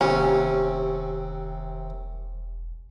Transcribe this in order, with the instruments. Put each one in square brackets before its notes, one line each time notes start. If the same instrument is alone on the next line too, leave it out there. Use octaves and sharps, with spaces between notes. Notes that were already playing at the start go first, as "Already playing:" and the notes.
[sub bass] E1 [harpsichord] D#2 C3 [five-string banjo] C#4